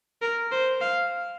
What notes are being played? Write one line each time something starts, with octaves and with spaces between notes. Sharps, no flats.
A#4
C5
F5